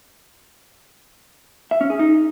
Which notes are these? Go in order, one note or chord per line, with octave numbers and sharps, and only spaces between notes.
E5
C#4
G#4
D#4